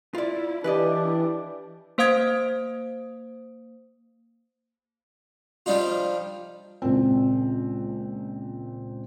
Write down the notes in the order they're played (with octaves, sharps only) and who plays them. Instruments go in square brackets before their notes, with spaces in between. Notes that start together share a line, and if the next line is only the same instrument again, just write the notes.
[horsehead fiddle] E4 [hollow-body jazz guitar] F4 D5
[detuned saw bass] E3 [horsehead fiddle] D4 [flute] G4 [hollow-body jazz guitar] B4 D5 D#5
[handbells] A#3 C5 F5 D#6 G#6 D7
[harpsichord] F3 G3 D4 D#4 F4
[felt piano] C#2 A#2 C4